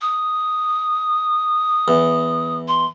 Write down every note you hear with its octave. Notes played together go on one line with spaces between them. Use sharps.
D#6
E2
C6